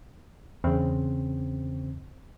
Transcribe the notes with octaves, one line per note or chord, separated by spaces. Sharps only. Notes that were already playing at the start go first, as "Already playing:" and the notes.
E2 C#3 C4